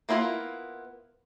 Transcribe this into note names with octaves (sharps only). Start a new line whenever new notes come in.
A#3 B3 E4 F4 A#4